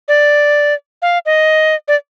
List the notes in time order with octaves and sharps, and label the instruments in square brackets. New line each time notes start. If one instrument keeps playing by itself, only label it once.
[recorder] D5
F5
D#5
D5